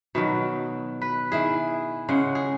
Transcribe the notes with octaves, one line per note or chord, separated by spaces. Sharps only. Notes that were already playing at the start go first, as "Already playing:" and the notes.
B2 D#3 F#3
B4
D#3 E4 G#4
C#3 G#3 F#5
G#4